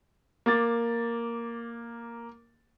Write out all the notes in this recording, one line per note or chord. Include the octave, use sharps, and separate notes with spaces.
A#3 D6 A6